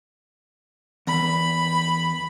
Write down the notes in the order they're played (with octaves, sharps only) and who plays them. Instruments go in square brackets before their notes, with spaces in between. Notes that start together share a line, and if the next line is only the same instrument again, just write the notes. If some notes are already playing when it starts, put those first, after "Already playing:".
[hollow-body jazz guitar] E2 [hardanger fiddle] B5